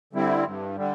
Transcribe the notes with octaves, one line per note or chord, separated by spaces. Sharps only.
D3 G3 C4 E4
G2
D3 G3